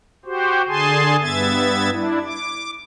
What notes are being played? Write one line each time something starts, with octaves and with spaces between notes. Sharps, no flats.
F#4 G4 C5
D3 G#4 G#5 A5 C6
G2 B3 E5 G#6 A6
D4 E4
D6